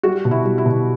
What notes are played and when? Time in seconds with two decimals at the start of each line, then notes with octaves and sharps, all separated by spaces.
0.03 G3 F#4
0.25 B2
0.31 E4
0.45 G3
0.58 E4
0.66 B2